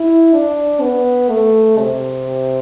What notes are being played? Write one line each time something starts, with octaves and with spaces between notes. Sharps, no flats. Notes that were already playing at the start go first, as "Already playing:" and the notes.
Already playing: E4
D4
B3
A3
C3